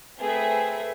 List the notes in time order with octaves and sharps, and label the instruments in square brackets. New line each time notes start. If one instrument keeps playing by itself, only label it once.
[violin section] A3 C4 G#4 B4 E5